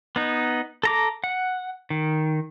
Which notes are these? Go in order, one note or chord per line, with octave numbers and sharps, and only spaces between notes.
B3 D#4
A4 A#5 D6
F#5
D#3